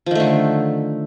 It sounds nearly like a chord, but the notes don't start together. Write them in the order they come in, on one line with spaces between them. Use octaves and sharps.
F3 D#3 A3 D3